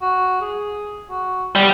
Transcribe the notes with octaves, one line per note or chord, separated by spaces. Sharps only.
F#4
G#4
F#4
G3 B3